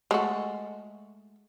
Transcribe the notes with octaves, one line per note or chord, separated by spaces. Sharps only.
G#3 A3 F#4